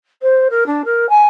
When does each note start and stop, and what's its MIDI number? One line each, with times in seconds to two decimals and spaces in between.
0.22 0.48 72
0.50 0.66 70
0.66 0.82 62
0.85 1.09 70
1.09 1.27 80